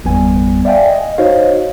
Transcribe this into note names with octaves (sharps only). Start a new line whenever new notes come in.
G1 E2 G3 B3 G#5
D5 E5 F5 G5 G#5
D#5
D#4 F#4 C5 C#5 D#5 F5